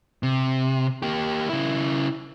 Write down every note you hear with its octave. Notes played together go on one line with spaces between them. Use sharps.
C3
A#3 G4
C#3 E4